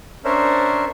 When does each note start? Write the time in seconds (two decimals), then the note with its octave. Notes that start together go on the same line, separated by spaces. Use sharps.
0.25 C#4 D4 A#4 C5 C#5 E5